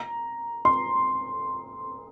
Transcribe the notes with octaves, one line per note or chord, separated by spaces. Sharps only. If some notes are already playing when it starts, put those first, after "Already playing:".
Already playing: A#5
C6